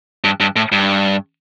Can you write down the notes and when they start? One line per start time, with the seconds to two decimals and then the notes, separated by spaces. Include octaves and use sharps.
0.24 G2
0.40 G2
0.56 A2
0.72 G2